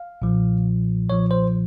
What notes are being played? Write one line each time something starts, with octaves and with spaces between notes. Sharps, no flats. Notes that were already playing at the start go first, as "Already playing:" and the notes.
Already playing: F5
B1 A#2 F3
B1 A#2 F3 C#5
C5